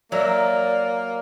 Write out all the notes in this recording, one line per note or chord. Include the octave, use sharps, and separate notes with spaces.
F#3 A#3 D5 E5 A#5